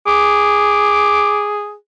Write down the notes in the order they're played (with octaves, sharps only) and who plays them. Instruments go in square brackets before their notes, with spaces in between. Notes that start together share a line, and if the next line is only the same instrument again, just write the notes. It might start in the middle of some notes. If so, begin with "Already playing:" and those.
[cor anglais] G#4 [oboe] D6